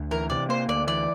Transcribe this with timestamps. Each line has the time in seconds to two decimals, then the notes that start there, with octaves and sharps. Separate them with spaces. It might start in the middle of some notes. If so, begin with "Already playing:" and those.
Already playing: D2
0.11 E3 A#4
0.30 C3 D5
0.49 A#3 C5
0.69 D2 D5
0.87 E3 D5